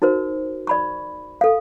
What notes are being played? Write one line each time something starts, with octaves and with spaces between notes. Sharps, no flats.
D#4 F#4 A#4 C5
D5 B5 C#6
A4 F5